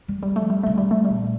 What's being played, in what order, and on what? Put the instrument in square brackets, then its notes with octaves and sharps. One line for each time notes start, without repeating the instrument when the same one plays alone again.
[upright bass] G3
[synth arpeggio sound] G3
[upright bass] F3 [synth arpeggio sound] A3
[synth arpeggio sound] G3
[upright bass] D3 [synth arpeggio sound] A3
[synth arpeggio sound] G3
A3
G3
[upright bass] A#2